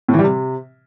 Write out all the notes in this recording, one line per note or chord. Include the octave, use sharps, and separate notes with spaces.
A2
E3
G3
C3